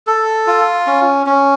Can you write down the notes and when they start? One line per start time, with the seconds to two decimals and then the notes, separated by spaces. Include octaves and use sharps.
0.07 A4
0.47 F4
0.87 C#4
1.26 C#4